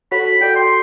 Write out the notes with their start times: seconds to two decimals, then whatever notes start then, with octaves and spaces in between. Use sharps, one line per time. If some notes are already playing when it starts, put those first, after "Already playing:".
0.12 F#4 A4 C#5 B5
0.41 F#4 A4 D5 G5
0.56 C6